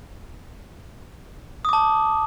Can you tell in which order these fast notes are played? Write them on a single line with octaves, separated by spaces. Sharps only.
D#6 D6 A5